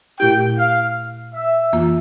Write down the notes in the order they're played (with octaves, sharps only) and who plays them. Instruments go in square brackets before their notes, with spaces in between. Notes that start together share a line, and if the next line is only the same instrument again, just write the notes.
[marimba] A#2 A3 E4 G4 [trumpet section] G5
[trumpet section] F5
E5
[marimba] F2 E3 A#3 F4